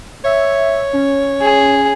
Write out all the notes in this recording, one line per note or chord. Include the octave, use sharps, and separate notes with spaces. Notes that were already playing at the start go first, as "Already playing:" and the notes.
C#5 E5
C#4
G#4